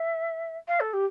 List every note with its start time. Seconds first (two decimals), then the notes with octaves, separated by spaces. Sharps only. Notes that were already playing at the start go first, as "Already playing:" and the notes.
Already playing: E5
0.68 F5
0.80 A4
0.93 G4